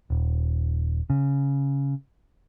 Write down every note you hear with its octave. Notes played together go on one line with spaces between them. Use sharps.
D#1
C#3